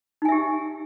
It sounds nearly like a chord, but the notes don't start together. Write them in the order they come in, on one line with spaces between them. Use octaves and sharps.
D#4 G#5 E5 G4